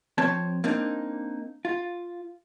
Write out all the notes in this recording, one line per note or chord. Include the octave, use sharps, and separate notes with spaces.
F2 C4 C5 C#5 A5
A#3 C4 D4 D#4
F4